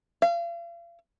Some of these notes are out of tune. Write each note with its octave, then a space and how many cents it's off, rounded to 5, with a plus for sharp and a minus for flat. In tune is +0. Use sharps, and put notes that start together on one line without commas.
F5 -40